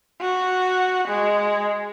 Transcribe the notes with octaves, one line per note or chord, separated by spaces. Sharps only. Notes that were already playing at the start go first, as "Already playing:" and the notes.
F#4
G#3